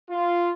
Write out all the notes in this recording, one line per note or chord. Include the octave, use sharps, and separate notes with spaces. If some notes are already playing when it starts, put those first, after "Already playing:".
F4